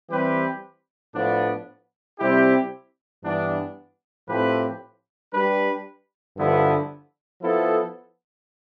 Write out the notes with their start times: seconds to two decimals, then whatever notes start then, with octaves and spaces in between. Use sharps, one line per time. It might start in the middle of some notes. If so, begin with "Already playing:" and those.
0.08 E3 G3 C4 G4 B4
1.14 A2 F3 B3 D4
2.18 C3 G3 C4 E4 G4
3.23 G2 E3 B3 D4
4.27 A2 F3 C4 G4 B4
5.32 G3 D4 G4 B4
6.37 G2 D3 F3 B3 E4
7.42 F3 B3 E4 A4